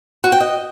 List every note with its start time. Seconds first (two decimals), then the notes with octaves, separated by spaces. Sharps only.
0.24 F#4
0.32 G5
0.40 D#5